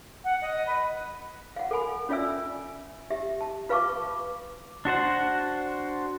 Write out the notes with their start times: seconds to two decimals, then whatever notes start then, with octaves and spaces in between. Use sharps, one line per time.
0.24 F#5
0.42 D#5
0.65 B4
1.56 F5 F#5
1.71 A4 A#4 G#5 B5
2.09 C#4 F4 D5 E5 G#5 E6
3.11 G4 E5
3.41 A5
3.69 F4 B4 F5 A5 C#6 D6
4.85 D4 F#4 C5 F#5